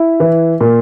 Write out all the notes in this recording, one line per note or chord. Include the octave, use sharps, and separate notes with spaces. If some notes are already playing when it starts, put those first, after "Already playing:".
Already playing: E4
E3
A#2